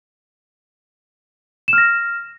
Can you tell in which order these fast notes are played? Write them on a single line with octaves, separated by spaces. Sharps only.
E7 F6 A#6